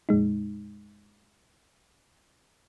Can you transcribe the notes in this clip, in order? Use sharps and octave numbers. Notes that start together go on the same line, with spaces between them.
F2 A#2 G#3 D#4